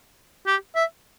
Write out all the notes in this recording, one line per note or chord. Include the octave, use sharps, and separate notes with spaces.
G4
E5